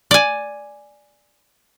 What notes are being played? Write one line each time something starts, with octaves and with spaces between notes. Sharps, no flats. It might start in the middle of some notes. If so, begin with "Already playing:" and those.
D5 G#5